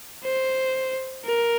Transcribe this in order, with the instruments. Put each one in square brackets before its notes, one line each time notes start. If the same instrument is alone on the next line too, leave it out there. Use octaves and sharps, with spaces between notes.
[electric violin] C5
A#4